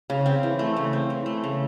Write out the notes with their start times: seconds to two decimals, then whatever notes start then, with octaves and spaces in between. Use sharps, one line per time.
0.10 C#3
0.26 C4
0.43 E3
0.59 A3
0.76 C#3
0.93 C4
1.10 E3
1.26 A3
1.44 C#3